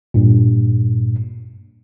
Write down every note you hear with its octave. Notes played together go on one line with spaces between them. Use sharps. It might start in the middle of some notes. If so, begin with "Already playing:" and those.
G2 A#2